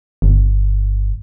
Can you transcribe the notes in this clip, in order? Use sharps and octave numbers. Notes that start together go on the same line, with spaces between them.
G1